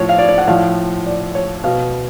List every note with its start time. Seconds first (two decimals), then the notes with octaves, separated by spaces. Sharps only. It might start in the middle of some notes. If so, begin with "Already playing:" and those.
Already playing: A2 F3 C#5
0.09 F5
0.19 D5
0.29 D5
0.38 F#5
0.48 A2 F3 F5
1.07 D5
1.35 C#5
1.64 B2 F5